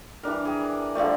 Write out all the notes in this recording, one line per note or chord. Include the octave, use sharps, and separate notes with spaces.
E3 G3 D4 A#4
G#4
D3 F3 G3 A3